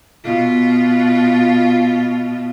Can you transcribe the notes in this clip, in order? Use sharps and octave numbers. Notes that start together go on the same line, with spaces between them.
B2 F4